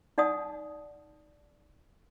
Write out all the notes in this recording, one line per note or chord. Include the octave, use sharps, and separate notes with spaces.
D#4 D5 F#5 A5 D#6